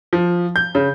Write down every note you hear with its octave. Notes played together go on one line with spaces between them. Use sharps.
F3
G6
C#3